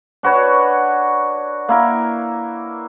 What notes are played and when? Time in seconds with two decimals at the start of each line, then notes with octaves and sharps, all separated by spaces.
0.23 D4 F#4 B4 C#5
1.69 A#3 E4 A#4